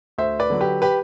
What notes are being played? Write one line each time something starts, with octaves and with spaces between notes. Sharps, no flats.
D2 C5 E5
B4 D5
D3 F#3
G4 B4
G4 B4